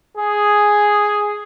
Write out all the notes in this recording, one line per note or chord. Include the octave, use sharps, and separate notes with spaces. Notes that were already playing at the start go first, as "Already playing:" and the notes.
G#4